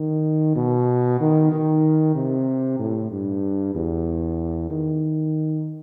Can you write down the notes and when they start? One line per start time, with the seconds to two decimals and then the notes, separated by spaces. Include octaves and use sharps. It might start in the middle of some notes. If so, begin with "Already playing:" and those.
Already playing: D#3
0.56 B2
1.20 D#3
1.52 D#3
2.15 C3
2.79 A2
3.12 G2
3.75 E2
4.71 D#3